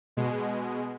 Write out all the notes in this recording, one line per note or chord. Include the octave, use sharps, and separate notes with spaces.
B2 G#3